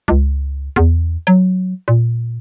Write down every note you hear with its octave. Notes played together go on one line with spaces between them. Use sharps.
C#2
E2
F#3
A#2